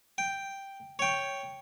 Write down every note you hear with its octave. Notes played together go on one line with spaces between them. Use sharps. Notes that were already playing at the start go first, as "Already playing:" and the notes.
G5
C#5 G5